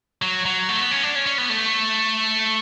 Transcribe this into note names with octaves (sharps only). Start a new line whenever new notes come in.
F#3
F#3
A3
B3
C#4
D4
C#4
C#4
B3
A3